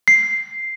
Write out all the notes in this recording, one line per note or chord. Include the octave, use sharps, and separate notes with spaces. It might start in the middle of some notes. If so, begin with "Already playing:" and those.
C7